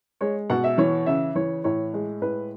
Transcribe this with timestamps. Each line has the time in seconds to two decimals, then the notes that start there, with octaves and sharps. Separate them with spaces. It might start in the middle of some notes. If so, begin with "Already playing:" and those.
0.21 G#3 C#5
0.50 B2 F#5
0.64 E5
0.78 E3 C#5
1.06 C#3 E5
1.35 E3 C#5
1.64 A2 C#5
1.94 G#3
2.22 A2 B4